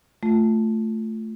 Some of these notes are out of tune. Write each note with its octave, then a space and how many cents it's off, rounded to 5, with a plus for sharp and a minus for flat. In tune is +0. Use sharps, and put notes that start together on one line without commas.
A3 +0 F4 +0